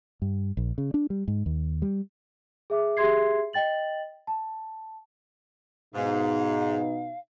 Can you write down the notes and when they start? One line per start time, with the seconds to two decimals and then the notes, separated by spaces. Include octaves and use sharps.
0.22 G2
0.57 A#1
0.78 C#3
0.94 D4
1.10 G3
1.28 G#2
1.46 D#2
1.82 G3
2.70 G#4 E5 D6
2.97 G4 G#4 E5 C6 G#6 C7
3.53 D#5 G5 A6 F#7
4.27 A5
5.95 G#2 B2 D#4 F5